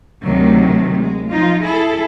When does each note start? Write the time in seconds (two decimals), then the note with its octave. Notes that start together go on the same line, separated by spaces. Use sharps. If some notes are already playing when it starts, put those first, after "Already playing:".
0.24 D2 C3 D#3 F#3 A3
0.96 G#3
1.31 F3 D#4 F4
1.64 E4 G#4 A4